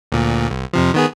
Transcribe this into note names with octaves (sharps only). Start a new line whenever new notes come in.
D2 A#2
C2
F2 C3 F3
D#3 B3 G#4